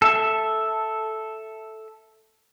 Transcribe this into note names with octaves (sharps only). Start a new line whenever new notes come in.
A4 E5